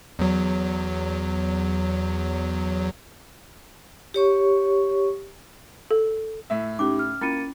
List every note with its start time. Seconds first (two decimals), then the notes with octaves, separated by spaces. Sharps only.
0.19 E2 F#3
4.14 G4 C#5 C#6
5.91 A4
6.50 A2 E5
6.79 A2 C#4 D#4 G4 D6
6.99 F6
7.21 A#3 C#4 E4 F4 A6 C#7 D#7